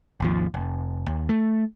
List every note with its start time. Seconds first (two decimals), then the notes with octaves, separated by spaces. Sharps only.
0.20 G#1 D#2 F3
0.54 F1
1.08 D#2
1.29 A3